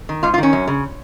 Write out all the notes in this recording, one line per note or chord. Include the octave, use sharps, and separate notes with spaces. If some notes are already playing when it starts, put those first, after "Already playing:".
D#3
G#2 F4
F4
D#3
C#4
F#2
C#3